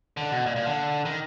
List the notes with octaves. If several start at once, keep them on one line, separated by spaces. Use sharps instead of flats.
D3
B2
A#2
A#2
D3
D#3